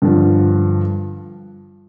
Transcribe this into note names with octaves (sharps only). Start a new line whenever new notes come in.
G2 D3 F3